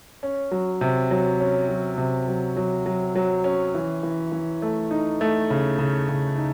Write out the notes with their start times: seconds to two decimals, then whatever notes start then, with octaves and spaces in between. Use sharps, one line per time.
0.23 C#4
0.51 F#3
0.81 C3
1.11 F#3
1.40 C#4
1.69 F#3
1.98 C3
2.28 F#3
2.57 F#3
2.86 F#3
3.16 F#3
3.44 C#4
3.75 E3
4.03 E3
4.32 E3
4.62 A3
4.91 D#4
5.21 A3
5.50 C#3
5.79 C#3
6.09 C#3
6.37 D#4